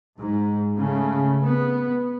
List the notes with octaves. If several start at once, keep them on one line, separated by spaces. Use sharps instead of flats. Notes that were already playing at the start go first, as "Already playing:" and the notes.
G#2
C#3 A3
B3